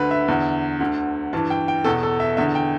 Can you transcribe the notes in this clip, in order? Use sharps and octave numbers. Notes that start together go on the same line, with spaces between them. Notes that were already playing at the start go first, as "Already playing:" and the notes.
Already playing: D2 D3 B4
E5
E2 D3
D2 D3
G2 E3 A5
G5
G5
E2 B2 A4
A4
E5
E2 D3 E5
G5